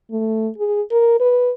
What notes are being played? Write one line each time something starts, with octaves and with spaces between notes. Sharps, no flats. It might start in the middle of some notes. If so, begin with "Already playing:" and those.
A3
G#4
A#4
B4